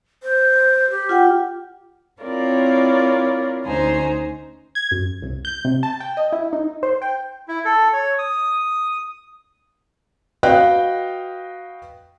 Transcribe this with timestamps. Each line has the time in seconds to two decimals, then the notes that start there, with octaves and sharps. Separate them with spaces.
0.23 C5
0.90 G4
1.09 F4 F#5 G5
2.21 C4 E4 F4 A#4 C#5 D5
3.66 D2 C#4 D#4 C5 G#5 A#5
4.75 G#6
4.91 F#2
5.22 C2
5.45 G6
5.65 C3
5.83 A5
6.00 G5
6.17 D#5
6.32 E4
6.53 D#4
6.83 C5
7.02 G5
7.48 E4
7.65 A4
7.93 C#5
8.19 D#6
10.43 F#4 B4 D#5 F5 G5 F#6